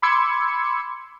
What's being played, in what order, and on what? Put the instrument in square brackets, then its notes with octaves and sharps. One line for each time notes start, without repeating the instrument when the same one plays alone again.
[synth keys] B5 C6 D6 E6 G#6 C#7